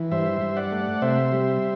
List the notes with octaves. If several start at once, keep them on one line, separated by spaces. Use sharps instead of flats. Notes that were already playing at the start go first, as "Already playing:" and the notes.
Already playing: E3
G2 C5 E5
G2
D5 F#5
A3
C3 C5 E5
G3